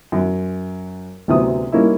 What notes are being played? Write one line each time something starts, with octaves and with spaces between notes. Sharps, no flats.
F#2
D2 A2 C3 F#3 B3 D#6
G3 A#3 C#4 D#4 E4